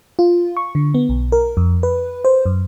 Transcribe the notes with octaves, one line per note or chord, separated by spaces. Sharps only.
F4
C#6
D3
B3
B1
A#4
F2
B4
C5
F#2